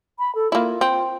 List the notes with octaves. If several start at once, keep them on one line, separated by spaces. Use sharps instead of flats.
B5
A4
A#3 E4 F4
C4